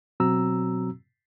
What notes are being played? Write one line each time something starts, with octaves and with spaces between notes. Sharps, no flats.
B2 F#3 C4 F#4 A#5 E6